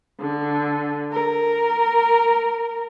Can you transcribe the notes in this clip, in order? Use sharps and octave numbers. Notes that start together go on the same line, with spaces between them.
D3
A#4